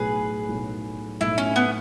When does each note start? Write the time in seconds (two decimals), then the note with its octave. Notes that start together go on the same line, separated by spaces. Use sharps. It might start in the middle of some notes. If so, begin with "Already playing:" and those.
Already playing: B1 A2 F#3 A3 G#4 B4
0.49 B1 A2 F#3 A3
1.21 B1 A2 F#3 A3 E4
1.38 C#4
1.56 B3